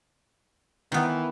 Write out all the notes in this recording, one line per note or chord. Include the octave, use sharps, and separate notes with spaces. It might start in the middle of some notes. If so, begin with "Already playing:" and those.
D#3 E3 B3